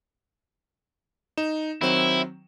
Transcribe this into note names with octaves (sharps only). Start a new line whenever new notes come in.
D#4 E7
D#3 F#3 C4 E4